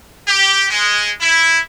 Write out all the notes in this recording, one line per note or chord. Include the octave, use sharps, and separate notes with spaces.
G4
G#3
E4